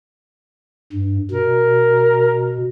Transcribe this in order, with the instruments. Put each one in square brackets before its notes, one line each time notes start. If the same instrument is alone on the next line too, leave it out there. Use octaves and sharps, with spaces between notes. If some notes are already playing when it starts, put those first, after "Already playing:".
[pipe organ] G2
[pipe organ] B2 [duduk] A#4